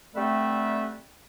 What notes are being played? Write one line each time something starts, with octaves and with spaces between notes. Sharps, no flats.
D3 G3 A3 C4 B4 E5